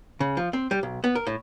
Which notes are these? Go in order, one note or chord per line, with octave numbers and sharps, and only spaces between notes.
C#3
F3
C4
G3
B1
B3
A#4
A2